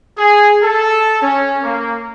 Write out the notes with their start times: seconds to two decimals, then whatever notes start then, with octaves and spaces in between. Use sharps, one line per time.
0.18 G#4
0.63 A4
1.22 C#4
1.64 A#3